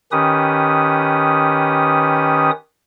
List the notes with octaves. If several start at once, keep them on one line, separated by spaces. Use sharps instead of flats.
D#3 C#4 G4 B4 D#6